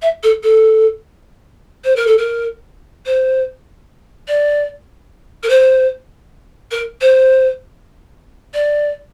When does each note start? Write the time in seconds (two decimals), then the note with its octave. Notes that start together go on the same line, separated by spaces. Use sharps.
0.02 E5
0.23 A4
0.43 A4
1.84 C5
1.96 A#4
2.07 A4
2.18 A#4
3.06 C5
4.28 D5
5.43 A#4
5.49 C5
6.71 A#4
7.01 C5
8.54 D5